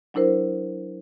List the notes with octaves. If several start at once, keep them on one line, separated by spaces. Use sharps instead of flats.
F#3 D4 E4 A#4 C5